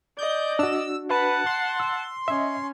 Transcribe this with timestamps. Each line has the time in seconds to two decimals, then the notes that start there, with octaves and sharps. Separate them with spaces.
0.18 D5 D#5 G6
0.59 D4 F#4 E6
1.10 B4 F#5 A5
1.46 C6
1.80 E6
2.28 C#4 D#5 E5